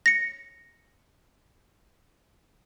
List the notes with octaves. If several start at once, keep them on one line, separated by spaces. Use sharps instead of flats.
A#6 C#7